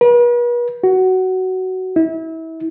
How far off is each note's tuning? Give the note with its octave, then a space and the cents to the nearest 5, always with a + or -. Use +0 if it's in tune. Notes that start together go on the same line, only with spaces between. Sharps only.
B4 -45
F#4 +15
E4 -30